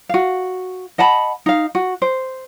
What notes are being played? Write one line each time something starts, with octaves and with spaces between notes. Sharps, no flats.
F#4 F5
D#5 F#5 A5 B5
D#4 F5
F#4
C5